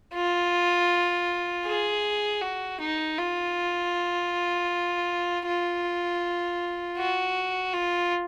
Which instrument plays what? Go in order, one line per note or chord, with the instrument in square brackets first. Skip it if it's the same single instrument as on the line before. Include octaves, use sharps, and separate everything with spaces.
[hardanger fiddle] F4
G#4
F#4
D#4
F4
F4
F#4
F4